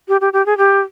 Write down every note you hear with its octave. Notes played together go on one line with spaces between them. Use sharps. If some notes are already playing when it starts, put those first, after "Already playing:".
G4
G4
G4
G#4
G4